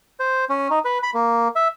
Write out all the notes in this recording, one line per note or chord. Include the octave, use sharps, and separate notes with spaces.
C5
C#4
D#4
B4
B5
A#3
E5